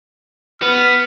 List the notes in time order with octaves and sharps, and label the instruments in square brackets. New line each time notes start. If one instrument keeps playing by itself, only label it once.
[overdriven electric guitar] B3 [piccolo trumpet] F6